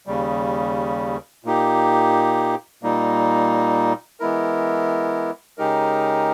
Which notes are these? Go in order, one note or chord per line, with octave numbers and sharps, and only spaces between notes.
D#2 C#3 G3
A#2 A#3 D#4 G4
A#2 G3 A#3 D#4
E3 G#3 B3 E4 A#4
C#3 G#3 D#4 G4 A#4